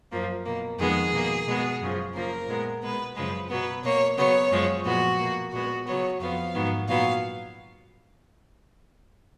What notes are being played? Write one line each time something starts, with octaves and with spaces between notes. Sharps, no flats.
F#2 F3 A#3
B2 A#3
F2 D#3 G#3 B3 G#4
B2 A#3
B2 G#3 B3
F#2 C#3 F3
C#3 F3 A#3 A#4
A#2 G#3 B3
B2 G#3 B3 B4
F#2 C#3 F3 G#3 B4
B2 F#3 B3 B4
B2 A#3 C#5
C#3 F#3 B3 C#5
F#2 F3 G#3
A#2 F3 G#3 B3 F#4
B2 A#3
A#2 G#3 B3 F#4
C#3 F#3 B3 C#5
F2 F3 B3 F5
G#2 D#3 F#3 B3
A#2 F#3 B3 F5